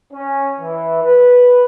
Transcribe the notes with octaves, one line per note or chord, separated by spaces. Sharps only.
C#4
E3
B4